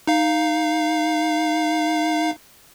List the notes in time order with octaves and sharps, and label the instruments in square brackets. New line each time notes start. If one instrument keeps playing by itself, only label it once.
[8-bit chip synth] D#4 F5